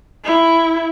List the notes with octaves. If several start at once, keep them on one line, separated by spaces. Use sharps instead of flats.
E4